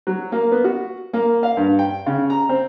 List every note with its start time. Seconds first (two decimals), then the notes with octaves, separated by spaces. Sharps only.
0.07 F#3
0.32 A#3
0.51 B3
0.64 F#4
1.13 A#3
1.43 F5
1.57 G2
1.79 G5
2.06 C#3
2.30 A#5
2.49 C4